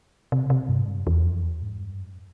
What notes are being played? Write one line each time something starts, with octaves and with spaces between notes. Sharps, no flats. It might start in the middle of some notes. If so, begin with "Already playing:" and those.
C3
C3
G2
G#2
G2
F#2
E2
F2
E2
G#2
G2
F#2